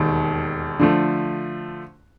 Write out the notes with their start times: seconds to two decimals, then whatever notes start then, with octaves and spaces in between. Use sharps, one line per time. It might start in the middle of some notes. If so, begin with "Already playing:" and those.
Already playing: E1 D#2 D#3
0.80 D3 F3 A3